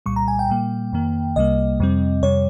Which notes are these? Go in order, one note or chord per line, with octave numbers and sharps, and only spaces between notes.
C2 A#2 G3 C#6
A#5
G#5
G5
A#2 G3 A#3
F2 D#3 A#3
C2 C3 G3 A#3 D#5
F2 C3 G3 C4
F2 C3 G3 C#5